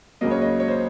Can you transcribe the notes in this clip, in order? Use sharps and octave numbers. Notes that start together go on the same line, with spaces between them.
C#2 C#3 F#3 A#3 D#5
C#5
D#5
C#5
C5